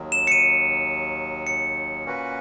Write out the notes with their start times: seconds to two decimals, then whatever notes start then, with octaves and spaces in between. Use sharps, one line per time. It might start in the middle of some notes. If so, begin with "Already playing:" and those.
Already playing: D#2 D#3 F#3
0.12 E7
0.27 C#7
0.32 D#7
1.47 C#7
2.04 A#2 A#3 C#4 F#4 B4